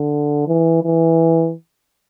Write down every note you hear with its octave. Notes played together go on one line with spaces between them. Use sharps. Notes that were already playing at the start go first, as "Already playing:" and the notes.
Already playing: D3
E3
E3